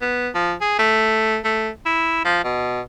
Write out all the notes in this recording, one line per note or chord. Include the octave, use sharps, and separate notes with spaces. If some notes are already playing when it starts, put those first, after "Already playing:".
B3
F3
G#4
A3
A3
E4
F3
B2